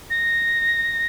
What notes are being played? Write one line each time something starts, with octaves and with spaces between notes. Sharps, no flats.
A#6